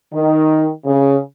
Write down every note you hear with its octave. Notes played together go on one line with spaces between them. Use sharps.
D#3
C#3